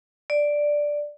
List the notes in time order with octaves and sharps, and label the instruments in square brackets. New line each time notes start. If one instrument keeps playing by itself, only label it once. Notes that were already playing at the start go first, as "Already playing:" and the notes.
[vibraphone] D5